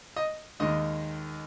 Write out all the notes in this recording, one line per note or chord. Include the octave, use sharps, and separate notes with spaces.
D#5
D#2 D#3 G#3 D#5